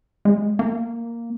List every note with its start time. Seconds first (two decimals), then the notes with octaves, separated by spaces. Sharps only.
0.25 G#3
0.59 A#3